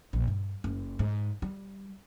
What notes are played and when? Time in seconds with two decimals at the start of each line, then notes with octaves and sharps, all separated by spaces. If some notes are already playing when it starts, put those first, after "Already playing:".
0.13 A#1
0.28 G2
0.64 F#1
0.99 G#2
1.42 G3